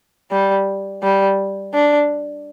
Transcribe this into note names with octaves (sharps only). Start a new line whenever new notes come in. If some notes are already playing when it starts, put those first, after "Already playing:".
G3
G3
D4